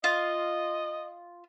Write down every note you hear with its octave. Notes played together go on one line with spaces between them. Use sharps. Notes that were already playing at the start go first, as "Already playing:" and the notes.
F4 D#5